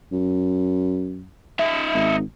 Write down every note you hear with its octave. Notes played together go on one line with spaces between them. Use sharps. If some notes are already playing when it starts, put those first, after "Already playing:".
F#2
D#4 E5
G#1